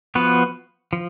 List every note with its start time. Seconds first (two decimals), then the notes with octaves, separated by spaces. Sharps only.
0.15 F3 B3 F#4 B4
0.93 F3